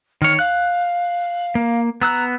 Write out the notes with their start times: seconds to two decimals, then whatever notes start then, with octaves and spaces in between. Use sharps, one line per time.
0.22 D#3 C#5 F6
0.39 F5 F#6
1.55 A#3
2.01 B3 A#5 E6 F#6